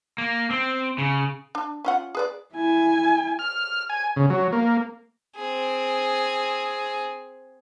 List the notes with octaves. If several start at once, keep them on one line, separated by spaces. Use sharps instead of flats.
A#3
C4
C#3
D4
C#4 F4 F#5
G#4 B4 D5
E4 G#5
F6
G#5
C#3
F#3
A#3
C4 G#4